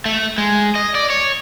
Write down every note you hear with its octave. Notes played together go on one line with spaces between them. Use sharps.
A3
G#3
D#5
D5
C#5